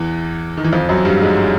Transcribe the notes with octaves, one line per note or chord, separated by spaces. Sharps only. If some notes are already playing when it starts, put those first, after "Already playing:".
Already playing: E2 E3
D#3
E3
F2 F3
F#2 F#3
G2 G3
G#2 G#3